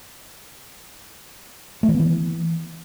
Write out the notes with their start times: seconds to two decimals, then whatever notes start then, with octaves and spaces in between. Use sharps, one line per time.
1.83 A3
1.89 E3
1.94 B3
2.00 E3